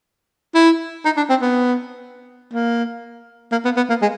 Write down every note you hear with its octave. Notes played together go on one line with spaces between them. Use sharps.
E4
D#4
D4
C4
B3
A#3
A#3
B3
B3
A#3
G#3